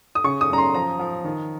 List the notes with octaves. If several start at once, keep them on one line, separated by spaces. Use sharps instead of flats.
D#6
C#3 C#6
D#6
F#2 A#5
C6
F3 A#5
F3
D#3